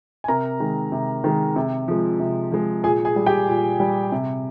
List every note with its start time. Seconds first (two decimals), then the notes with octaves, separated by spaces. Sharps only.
0.24 G#5
0.28 C3 A#4 A#5
0.60 D#3 G#3
0.92 C3
1.24 D#3 G#3
1.56 C3
1.88 F3 G#3
2.20 C3
2.52 F3 G#3
2.83 A#2 G#4 G#5
3.05 G#4 G#5
3.16 G3
3.26 G4 G5
3.48 A#2
3.80 G3
4.12 C3